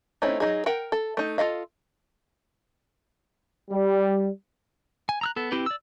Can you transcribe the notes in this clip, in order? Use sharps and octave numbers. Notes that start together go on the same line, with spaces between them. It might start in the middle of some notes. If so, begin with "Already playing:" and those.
A3 C4 C#4 D#4 E4
F#3 D#4 G#4
A#4 F#5 G5
A4
A3 D#4
F4 A4 D#5 F5
G3
G#5
A#5 E6 F#6
B3 A4
C4 E4 G4 B4
D5 E6